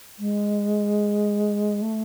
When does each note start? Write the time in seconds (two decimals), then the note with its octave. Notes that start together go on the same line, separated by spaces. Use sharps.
0.19 G#3
1.82 A3